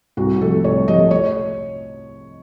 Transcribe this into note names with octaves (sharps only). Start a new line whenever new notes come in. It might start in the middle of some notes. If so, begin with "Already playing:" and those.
C2 F#4
C3 F3 A3 A4
C2 C#5
C3 F3 A3 D#5
C#5